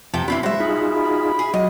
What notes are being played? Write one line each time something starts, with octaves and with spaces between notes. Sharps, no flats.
F2 C3 F3 A3 G5 A5
D#3 C4 D4 E4 F#4 B5
G3 G#3 F#4 C5 E5
D#4 F4 G#4 B5
G#4
F#3 D#5